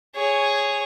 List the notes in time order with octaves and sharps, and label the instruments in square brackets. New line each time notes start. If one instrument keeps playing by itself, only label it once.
[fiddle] G#4 C#5